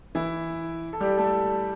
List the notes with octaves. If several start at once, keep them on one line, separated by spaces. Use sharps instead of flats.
E3 E4
A4
G3 G4
A3 A4